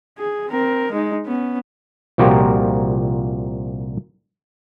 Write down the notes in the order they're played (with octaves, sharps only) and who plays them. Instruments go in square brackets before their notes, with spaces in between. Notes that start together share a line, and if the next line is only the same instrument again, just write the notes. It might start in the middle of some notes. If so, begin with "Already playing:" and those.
[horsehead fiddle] G#4
C4 A#4
G#3 D#4
B3 C#4
[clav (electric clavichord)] C2 A#2 F3 F#4 G4 A#4